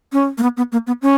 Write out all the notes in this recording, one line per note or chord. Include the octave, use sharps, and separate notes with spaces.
C#4
A#3
B3
B3
A#3
B3
C#4